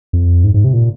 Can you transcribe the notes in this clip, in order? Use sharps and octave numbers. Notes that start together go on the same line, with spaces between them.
F2
G#2
G#2
C3
A#2